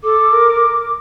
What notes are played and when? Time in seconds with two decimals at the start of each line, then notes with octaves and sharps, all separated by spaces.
0.04 A4 D6
0.33 A#4